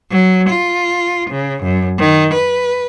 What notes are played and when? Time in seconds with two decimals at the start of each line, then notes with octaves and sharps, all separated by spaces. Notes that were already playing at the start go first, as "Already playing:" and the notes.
0.12 F#3
0.50 F4
1.30 C#3
1.63 F#2
1.99 D#3
2.34 B4